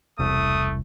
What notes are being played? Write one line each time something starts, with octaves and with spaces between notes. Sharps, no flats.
E1 C2 A3 D#6